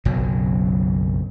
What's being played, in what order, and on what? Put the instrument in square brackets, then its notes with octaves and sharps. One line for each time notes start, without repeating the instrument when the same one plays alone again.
[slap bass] F#1 B1 B2 F#3